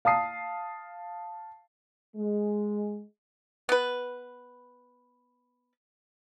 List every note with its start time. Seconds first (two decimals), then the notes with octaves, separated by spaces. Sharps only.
0.05 F5 A5 D#6 C7
2.16 G#3
3.69 B3 B4